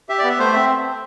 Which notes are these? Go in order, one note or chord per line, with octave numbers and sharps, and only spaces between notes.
G4 E5
D5
B3 E5
A3 C5
C4 E5